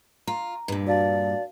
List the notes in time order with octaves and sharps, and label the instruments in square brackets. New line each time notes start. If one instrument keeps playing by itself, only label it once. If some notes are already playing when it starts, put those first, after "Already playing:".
[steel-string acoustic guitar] F4 [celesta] A#5
[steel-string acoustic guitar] G2 A#2
[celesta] F#4 F5 A5 [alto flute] D5